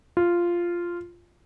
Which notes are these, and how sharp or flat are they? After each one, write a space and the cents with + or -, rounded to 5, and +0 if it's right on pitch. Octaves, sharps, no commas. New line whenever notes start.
F4 -5